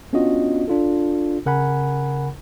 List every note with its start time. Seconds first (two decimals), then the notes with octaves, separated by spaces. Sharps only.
0.13 B3 C#4 D4 F4 F#4 D#5
0.68 D4 F4 A4
1.46 C#3 A#4 F#5 G#5 B5